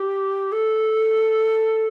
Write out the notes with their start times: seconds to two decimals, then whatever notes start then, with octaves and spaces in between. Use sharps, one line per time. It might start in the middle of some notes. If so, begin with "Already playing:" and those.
Already playing: G4
0.52 A4